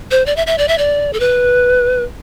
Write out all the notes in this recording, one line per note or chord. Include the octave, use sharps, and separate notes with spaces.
C5
D5
E5
E5
D5
E5
D5
A4
B4